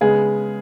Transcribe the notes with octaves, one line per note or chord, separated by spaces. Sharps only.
C#3 G#3 B3 G#4